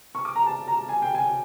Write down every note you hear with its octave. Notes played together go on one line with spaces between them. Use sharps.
C#6
D6
A#5
A5
A#5
G#5
G5
G#5